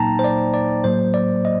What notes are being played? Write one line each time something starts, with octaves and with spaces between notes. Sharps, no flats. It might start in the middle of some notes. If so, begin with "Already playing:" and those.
Already playing: A#2 F#3 A#3 D#4 G5 A5 A#5
C5
D5
D5
A2 F#3 A#3 C5
D5
D#5